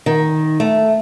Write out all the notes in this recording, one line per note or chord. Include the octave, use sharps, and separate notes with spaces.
D#3
A3